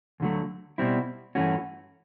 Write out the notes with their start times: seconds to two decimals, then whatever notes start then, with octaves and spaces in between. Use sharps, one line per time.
0.20 D2 D3 F#3 A3
0.78 B2 G3 C4 E4
1.35 G2 E3 A3 C#4 F#4